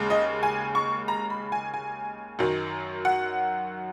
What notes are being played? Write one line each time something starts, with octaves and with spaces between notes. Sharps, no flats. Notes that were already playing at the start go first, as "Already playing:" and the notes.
Already playing: D#2 C#3 G#3
D#5
G#5
C#6
A#5
B5
G#5
G#5
F#2 D#3 F#3
F#5